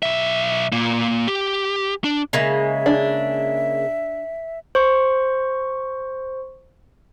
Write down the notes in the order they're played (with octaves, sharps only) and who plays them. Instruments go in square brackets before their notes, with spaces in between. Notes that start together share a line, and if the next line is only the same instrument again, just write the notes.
[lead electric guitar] B1 E5
A#2 A#3
G4
D4
[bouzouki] C#3 G#3 A#3 [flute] E5
[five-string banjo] D4
[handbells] C5 C#6